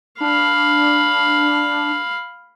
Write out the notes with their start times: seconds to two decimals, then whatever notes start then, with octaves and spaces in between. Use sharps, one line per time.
0.21 D4 F5 B5